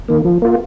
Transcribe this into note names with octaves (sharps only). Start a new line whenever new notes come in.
D#3 A#3
F3
A#3 F4